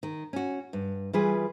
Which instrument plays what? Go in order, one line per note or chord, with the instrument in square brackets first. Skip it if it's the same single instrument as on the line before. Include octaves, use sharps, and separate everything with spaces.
[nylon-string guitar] D#3
C#4 F#4
G2
E3 G3 F4 G#4 B4